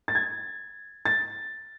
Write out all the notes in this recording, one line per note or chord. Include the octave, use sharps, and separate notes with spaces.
A6
G#6
A6